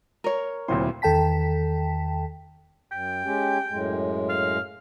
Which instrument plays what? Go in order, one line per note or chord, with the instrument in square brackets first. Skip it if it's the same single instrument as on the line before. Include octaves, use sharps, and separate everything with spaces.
[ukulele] A#4 C#5
[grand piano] D2 A#2 C6 [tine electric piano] F#3 C4 E4
[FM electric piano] E2 D#3 A4 G5 A5 B6
[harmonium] F#2 [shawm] G5
[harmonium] G#3 C#4 G4
F#2 A2 G#3
[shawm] F5